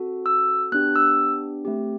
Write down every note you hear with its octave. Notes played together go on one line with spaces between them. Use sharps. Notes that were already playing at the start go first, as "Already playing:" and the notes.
Already playing: C4 F#4 A4
E6
B3 D4 G4 F#6
E6
A3 C4 G4